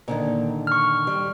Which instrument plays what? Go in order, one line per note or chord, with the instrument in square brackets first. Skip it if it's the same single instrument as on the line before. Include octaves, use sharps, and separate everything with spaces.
[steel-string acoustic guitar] A#2 D3 D#3
[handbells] C#6 F6
[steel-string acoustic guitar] G3